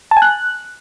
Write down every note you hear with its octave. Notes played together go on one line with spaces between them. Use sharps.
A5
G#5
F#6